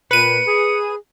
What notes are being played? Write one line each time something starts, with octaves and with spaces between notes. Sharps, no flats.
A#2 B4 C#7 D#7
G#4